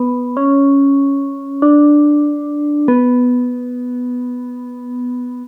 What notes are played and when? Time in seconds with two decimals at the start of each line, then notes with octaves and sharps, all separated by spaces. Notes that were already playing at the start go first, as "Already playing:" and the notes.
Already playing: B3
0.37 C#4
1.62 D4
2.88 B3